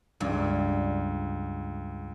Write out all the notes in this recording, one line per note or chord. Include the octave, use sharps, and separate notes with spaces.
C#2 G2